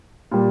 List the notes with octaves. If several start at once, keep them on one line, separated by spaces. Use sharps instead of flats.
A#2 G3